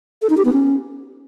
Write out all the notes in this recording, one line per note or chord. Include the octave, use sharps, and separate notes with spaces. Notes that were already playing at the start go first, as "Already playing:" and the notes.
A4
D#4
G4
B3
C#4